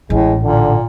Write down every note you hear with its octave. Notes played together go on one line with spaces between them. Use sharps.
A1 A2 G#3
A#2 D3